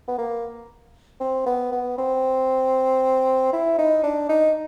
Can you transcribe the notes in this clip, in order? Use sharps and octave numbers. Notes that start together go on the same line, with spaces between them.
B3
A#3
C4
B3
B3
C4
E4
D#4
D4
D#4